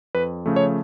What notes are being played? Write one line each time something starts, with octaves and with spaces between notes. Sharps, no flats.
F2 B4
C#3 F3 A3
C#5